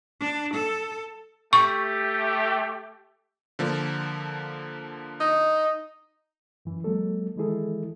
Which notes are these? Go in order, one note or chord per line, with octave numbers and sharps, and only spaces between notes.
D4
A4
A3 G4 C#6
D3 F3 A#3
D#4
F#2 E3
F#3 G#3 A#3 A4
D#3 E3 G#3 E4 G#4 A4